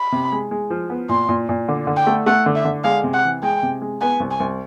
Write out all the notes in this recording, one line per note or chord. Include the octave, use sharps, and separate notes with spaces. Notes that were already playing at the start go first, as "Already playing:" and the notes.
Already playing: B5
C3
G#3
G#3
F3
B3
A#2 C6
A#2
A#2
D3
D3
G5
A3
A3 F#5
D3
E5
D3
G#3 F5
C3
F#5
E3
G#3 G5
C3
G#3
B3 G#5
C2
G#5
C2